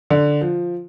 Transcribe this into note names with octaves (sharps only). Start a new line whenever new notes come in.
D3
F3